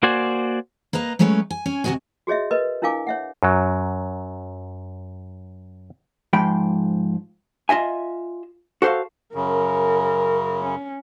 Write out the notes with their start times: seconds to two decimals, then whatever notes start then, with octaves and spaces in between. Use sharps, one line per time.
0.03 A#3 F#4 C5 D5 G#5
0.93 A#3 B4 D#5 A#5
1.19 F#3 G#3 A3 C#4 B4 C#5
1.50 G#5
1.66 C#4 C#5 G#5
1.84 D2 C3 E3 F#4 D#5 G#5
2.27 F#4 G#4 C#5 D#5 E5
2.51 A#4 B4 D#5
2.82 D4 E4 A#4 F5 G#5 D6
3.07 C#5 E5 F#5
3.43 F#2 F#3
6.33 G#2 F3 G#3 G5 B5
7.69 F4 D#5 E5 G#5
8.82 F#4 A4 C5 E5 F5
9.35 F#2 C#3 A#4
10.64 C#4